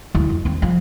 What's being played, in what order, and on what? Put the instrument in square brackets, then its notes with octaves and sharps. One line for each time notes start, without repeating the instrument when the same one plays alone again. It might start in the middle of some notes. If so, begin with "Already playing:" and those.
[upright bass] D2 E4
F2
D#2 C4
F3